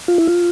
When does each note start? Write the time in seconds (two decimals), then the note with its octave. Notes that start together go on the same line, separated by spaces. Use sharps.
0.08 F4
0.18 E4
0.27 F4